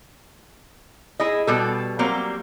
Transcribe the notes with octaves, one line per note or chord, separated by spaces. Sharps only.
E4 G#4 D#5
B2 G3 A4
F#3 G3 A#3 C4